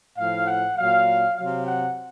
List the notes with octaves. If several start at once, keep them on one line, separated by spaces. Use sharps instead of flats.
A2 F3 F5
F#5
A#2 F#3 F5
C3 F#3 F5
F#5